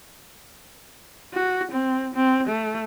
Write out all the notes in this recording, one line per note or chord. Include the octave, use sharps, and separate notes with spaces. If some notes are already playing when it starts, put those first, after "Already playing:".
F#4
C4
C4
A3